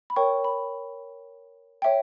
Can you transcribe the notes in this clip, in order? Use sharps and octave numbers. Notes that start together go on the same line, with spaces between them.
B5
A#4 C#5 G5 C#6
B5
C#5 E5 G5